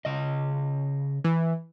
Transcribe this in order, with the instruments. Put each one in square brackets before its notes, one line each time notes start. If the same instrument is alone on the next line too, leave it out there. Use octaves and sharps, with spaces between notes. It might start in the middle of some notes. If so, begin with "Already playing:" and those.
[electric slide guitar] C#3 D#5
[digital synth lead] E3